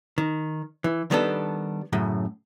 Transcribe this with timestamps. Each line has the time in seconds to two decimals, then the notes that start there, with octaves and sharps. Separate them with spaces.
0.18 D#3
0.84 E3
1.11 D#3 G3 B3 D4 A4
1.93 F#2 A2 C#3